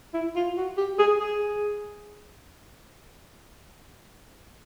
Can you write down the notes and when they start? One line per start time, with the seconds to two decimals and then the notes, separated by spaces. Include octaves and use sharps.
0.14 E4
0.36 F4
0.57 F#4
0.77 G4
0.99 G#4
1.20 G#4